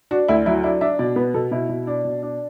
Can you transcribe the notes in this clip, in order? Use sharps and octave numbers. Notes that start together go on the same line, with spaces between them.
D4 F#4
D2 E4
F#3 E4
D4 E4
D4 E5
B2 D5
B3 B4
B2 A4
B2 E4
B2
D4
B2
D4